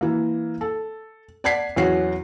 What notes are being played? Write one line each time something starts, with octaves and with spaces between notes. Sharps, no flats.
E3 A#3
A4
D5 F#5 A5 G#6 B6 C7
E2 F#3 C#4 F#4 C7